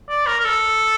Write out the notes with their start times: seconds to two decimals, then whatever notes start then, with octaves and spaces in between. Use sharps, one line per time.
0.09 D5
0.27 A#4
0.40 A#4
0.45 A4